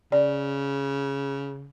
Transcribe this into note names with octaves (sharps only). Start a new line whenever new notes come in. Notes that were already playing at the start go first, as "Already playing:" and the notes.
C#3 D5